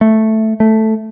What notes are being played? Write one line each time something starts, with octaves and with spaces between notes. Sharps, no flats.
A3
A3